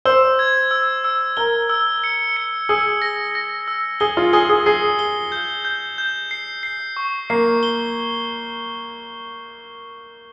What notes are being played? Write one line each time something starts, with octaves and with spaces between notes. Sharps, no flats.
C5 E6
G#6
E6
E6
A#4 G7
E6
C#7
C#7
G#4 E6
A#6
A#6
E6
G#4 G7
F4
G#4 G7
G#4
G#4 C7
G7
G6
G6
G6
C7
C7
C#6
A#3 C7
G7